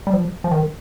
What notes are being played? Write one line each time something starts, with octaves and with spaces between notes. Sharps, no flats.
G3
F3
F3
D#3